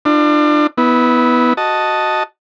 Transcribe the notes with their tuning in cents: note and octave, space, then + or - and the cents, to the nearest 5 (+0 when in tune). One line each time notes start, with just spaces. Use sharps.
D4 +30 F4 -30
B3 +0 E4 -25
F#4 +0 D#5 +0 A5 +0